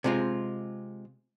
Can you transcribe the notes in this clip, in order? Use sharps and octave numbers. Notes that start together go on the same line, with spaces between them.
C3 G#3 F4